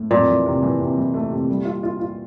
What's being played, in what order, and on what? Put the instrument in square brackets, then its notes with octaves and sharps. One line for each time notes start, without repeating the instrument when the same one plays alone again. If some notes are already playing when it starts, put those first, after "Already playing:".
Already playing: [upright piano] A2
[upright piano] F2 [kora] A#2
[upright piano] E3
C3
E3
C3
E3
A3
C3
G3
F4
F4
F4